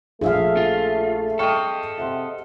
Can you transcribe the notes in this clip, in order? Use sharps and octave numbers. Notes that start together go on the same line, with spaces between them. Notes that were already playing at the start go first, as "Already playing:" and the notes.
A#1 A3 G#4 E5 F5
F4
A4 D#5 G5 C#6 F6
C3 E5 F#5 C6